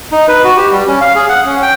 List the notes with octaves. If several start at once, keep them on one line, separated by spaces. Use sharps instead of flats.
D#4
B4
F#4
G4
G3
C#4
F5
G#4
F#5
C#4
G5